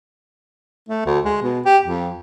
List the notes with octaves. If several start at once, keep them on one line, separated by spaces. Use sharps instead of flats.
A3
D2
G#3
B2
G4
F2